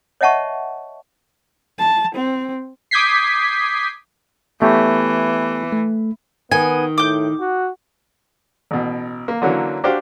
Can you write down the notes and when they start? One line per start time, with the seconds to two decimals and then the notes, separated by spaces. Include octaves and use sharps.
0.21 C#5 D#5 E5 F#5 A5 C#6
1.79 A5
2.15 C4
2.91 D6 D#6 G6 G#6 B6 C7
4.62 E3 A3 B3 G4 C#5
5.72 A3
6.51 D#3 B3 G#5
6.98 A2 D6 G6
7.40 F#4
8.71 A1 B2
9.28 A#3
9.42 D3 E3 F#3 A#3 C#4
9.84 D4 F#4 G4 C5 F5